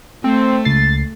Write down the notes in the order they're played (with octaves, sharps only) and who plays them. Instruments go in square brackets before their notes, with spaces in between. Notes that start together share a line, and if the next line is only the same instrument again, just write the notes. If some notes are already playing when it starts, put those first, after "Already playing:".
[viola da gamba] A3 [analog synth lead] C4
[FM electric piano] C#2 C7 [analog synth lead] A6